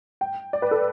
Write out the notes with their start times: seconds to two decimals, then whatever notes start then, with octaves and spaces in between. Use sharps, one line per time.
0.21 G5
0.53 D5
0.62 B4
0.71 A4